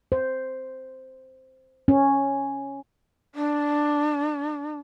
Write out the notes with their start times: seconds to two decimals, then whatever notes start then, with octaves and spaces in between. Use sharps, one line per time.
0.12 C5
1.88 C#4
3.35 D4